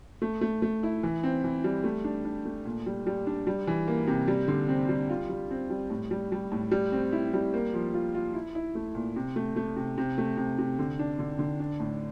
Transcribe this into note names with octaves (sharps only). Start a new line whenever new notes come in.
A3
A3
A3
E4
E3
C4
E3
G3
A3
D4
D4
A3
A#2
G3
G3
D4
G3
E3
A#3
C3
G3
D3
C4
G3
F4
G3
C4
G3
A2
G3
G3
A2
G3
C4
E4
G3
A#3
F3
F4
F4
E4
E4
A3
A#2
C3
A3
A3
C3
C3
A3
C3
C3
D3
D4
D3
D3
D4
A2